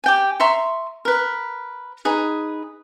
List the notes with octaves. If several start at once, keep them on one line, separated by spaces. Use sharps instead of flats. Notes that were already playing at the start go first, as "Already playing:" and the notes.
G4 G5 G#5
E5 A#5 C6 C#6
A#4 B4
D#4 G#4 B4